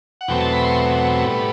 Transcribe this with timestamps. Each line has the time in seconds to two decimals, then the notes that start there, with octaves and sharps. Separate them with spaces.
0.21 F#5
0.28 E2 B2 F#3 A3 C4 G5
0.40 A5
0.53 B5
0.64 C6
1.25 A2 G3 B3